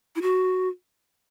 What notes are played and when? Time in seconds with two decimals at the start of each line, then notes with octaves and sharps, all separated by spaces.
0.16 E4
0.22 F#4